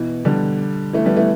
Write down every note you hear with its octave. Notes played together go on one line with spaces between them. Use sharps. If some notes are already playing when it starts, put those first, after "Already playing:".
Already playing: B2 E3
D3 G3
E3 A3
G3 B3
E3 A3